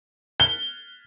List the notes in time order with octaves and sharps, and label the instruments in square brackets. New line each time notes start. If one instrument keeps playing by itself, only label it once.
[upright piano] G7